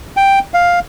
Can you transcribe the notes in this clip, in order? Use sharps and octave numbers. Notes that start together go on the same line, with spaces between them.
G5
F5